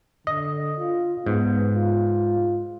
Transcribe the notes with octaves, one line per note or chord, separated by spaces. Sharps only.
D3 D#5
F4
G#2 B3
F4